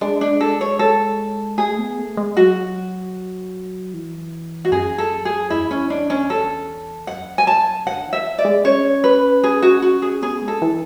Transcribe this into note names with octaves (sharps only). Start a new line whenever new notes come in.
G#3 D4
D4
A4
C#5
A4
A3 G#4
B3
A3
G#3
F#3 F#4
E3
F#4
F#2 G#4
A4
G#4
E2 E4
C#4
D4
C#4
A4
F#2 F#5
G#5
A5
D3 F#5
E3
E5
D5
G#3
C#4 C#5
B4
G#4
F#4
F#4
G#4
B3 G#4
G#3
A4
E3